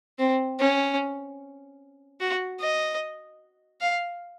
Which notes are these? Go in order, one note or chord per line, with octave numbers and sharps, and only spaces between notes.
C4
C#4
F#4
D#5
F5